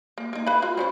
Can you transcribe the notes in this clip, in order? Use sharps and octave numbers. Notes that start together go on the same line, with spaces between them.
A#3
A#3 D#4
B4 F5 B5
F4 F#4
C4 C#4 C5